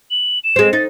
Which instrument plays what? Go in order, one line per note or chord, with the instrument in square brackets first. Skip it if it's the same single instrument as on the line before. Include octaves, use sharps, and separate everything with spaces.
[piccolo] F#7
E7
[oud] G#3 C4
[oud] D#4 [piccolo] A6